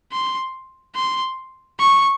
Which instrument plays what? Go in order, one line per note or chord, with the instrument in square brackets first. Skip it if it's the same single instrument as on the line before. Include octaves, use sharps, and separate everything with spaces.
[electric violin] C6
C6
C#6